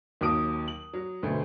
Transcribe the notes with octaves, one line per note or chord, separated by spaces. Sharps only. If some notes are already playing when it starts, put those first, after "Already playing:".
D#2 F#3 A5 D#6 D7
F#7
F#3
D2 B2 A3 C5